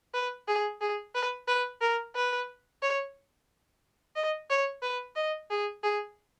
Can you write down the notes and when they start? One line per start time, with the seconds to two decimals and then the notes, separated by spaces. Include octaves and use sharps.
0.14 B4
0.48 G#4
0.81 G#4
1.15 B4
1.48 B4
1.81 A#4
2.16 B4
2.83 C#5
4.16 D#5
4.50 C#5
4.82 B4
5.16 D#5
5.50 G#4
5.83 G#4